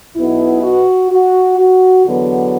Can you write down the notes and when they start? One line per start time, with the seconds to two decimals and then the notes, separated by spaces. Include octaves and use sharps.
0.16 B1 B2 B3 E4
0.63 F#4
1.11 F#4
1.58 F#4
2.05 E2 D3 F#3 B3